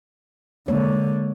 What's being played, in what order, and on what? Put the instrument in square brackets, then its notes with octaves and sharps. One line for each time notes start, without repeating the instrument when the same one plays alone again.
[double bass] D3 [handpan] G#3 A#3 C#5